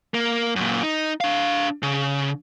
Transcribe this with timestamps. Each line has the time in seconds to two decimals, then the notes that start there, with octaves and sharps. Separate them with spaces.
0.14 A#3
0.56 F#2 A#2
0.83 D#4
1.21 D4 F5
1.83 C#3